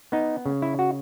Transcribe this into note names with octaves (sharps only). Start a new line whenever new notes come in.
B3 D#4
C#3
E4
F#4